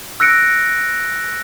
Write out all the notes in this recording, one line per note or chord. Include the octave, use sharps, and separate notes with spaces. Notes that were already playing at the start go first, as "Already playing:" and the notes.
E6 F#6 A#6 C#7 D7